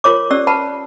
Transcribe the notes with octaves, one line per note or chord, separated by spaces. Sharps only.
F4 A#4 C#5 D6
C#4 G4 D5 E6
B4 F#5 A5 B5